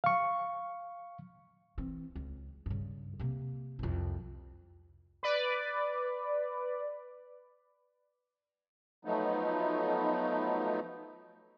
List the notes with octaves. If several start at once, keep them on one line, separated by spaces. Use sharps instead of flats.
F5 C#6
E3 C4
C#2
G2 C#3
C3 A#3
C2 F2
B4 D5
F3 F#3 A3 B3 D#4